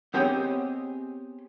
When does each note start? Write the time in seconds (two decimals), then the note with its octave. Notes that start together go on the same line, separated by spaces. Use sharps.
0.14 B3 C4 G4 G#4 C#5 D#5